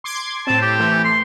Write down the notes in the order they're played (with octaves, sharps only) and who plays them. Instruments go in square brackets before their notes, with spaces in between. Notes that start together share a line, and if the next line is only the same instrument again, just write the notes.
[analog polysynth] C6 D6 G#6
[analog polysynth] A2 C4 [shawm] A5
[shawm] G4
[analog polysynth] E3 A3
[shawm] C6